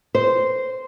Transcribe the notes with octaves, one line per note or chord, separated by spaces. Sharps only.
C5